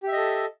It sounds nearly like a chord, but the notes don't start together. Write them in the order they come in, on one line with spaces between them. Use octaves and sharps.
G4 E5 D#5 A4